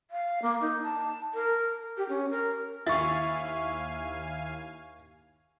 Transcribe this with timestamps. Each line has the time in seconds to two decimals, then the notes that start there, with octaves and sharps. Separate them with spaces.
0.11 F5
0.42 A#3
0.61 D#4
0.83 A5
1.34 A#4
1.97 G4
2.09 C#4
2.30 A#4
2.87 D#2 E4 F5 G#5 C#6 A6